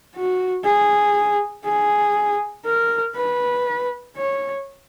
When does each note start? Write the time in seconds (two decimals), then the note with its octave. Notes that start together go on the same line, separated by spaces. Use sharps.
0.15 F#4
0.64 G#4
1.65 G#4
2.66 A#4
3.16 B4
4.17 C#5